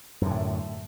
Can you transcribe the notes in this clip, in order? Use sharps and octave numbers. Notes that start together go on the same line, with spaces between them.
F#2 A2 D3